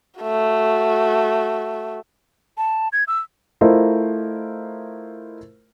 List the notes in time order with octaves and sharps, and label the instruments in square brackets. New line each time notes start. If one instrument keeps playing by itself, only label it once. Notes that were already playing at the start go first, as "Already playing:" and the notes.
[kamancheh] A3 F#4
[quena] A5
G#6
E6
[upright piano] A3 E4 F4 A#4 C5 D#5